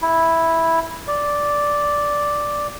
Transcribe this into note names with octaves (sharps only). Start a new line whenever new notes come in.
E4
D5